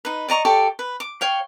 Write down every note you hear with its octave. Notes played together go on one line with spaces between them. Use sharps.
D#4 B4
D5 D#5 A#5 C#6
G4 A4 D5 C#6
B4
D6
C#5 F5 G5